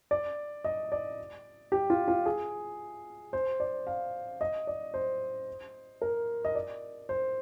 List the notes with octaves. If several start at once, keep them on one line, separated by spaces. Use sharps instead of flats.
D5
D#5
D5
G4
F4
F4
G#4
C5
D5
F5
D#5
D5
C5
A#4
D#5
D5
C5